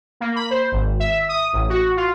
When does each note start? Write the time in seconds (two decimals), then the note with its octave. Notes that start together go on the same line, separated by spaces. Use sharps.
0.21 A#3
0.36 B5
0.50 C5
0.72 G#1
1.00 E5
1.29 D#6
1.53 A1
1.69 F#4
1.97 F4